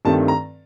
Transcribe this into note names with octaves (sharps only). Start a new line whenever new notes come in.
G2 D#3 A3 C4 A5
A#5